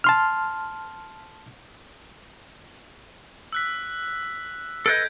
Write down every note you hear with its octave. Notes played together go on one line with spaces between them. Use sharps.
A5 C6 F6
E6 F#6 B6
A4 B4 D#5 G6 G#6 D7